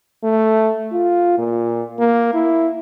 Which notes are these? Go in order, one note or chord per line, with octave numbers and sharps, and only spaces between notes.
A3
F4
A#2
A#3
E4